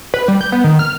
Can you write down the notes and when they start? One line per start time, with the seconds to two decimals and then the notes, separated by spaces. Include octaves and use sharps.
0.14 B4
0.28 G3
0.41 G6
0.52 B3
0.64 D#3
0.79 F6